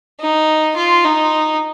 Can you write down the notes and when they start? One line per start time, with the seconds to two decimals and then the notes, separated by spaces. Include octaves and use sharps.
0.20 D#4
0.76 F4
1.05 D#4